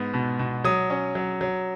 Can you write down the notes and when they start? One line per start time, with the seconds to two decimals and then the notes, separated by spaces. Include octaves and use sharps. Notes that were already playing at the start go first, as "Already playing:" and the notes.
Already playing: G#2 B3
0.14 B2
0.39 B2
0.64 F#3 D#6
0.90 C#4
1.15 F#3
1.41 F#3